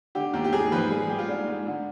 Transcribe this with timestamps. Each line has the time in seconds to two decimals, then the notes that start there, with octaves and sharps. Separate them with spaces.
0.15 D3 G4
0.33 D#2 G4
0.44 G4
0.53 D#2 G#4
0.72 F3 B4
0.90 G3 G#4
1.01 G#4
1.09 G3 G4
1.19 F4
1.28 G#2 D4
1.47 G#2
1.67 D3